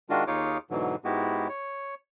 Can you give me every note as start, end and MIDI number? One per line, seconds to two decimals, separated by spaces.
0.10 0.24 51
0.10 0.24 56
0.10 0.24 62
0.10 0.24 65
0.10 0.24 66
0.27 0.58 39
0.27 0.58 63
0.27 0.58 65
0.27 0.58 68
0.27 0.58 73
0.27 0.58 86
0.71 0.96 44
0.71 0.96 47
0.71 0.96 50
0.71 0.96 52
0.71 0.96 54
1.04 1.48 44
1.04 1.48 56
1.04 1.48 59
1.04 1.48 64
1.04 1.48 66
1.04 1.48 67
1.48 1.95 73